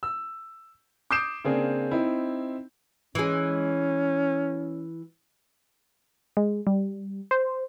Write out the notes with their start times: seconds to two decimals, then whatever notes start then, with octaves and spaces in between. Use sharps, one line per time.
0.03 E6
1.11 D6 D#6 G6 C7 D7 E7
1.45 C#3 A#3 C4 D4 G#4
1.91 C4 D#4 E4
3.15 E3 G#3 C#4
6.37 G#3
6.67 G3
7.31 C5